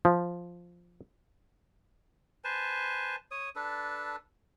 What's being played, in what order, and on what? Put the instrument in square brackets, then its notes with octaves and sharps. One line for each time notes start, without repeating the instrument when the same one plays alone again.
[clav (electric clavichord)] F3
[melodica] B4 C5 G#5 A5
C#5 D#6
D4 A4 B4